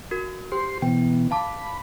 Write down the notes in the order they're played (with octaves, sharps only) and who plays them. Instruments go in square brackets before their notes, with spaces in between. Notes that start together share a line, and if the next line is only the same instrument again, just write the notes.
[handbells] F#4 A#4
[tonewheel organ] G4 C6 [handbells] C5
[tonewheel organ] B2 E3 B3 [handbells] G5
[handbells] F5 A5 D6 [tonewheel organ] B5